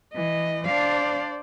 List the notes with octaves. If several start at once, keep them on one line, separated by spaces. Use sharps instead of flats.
E3 D#5
D4 C5 D5 F5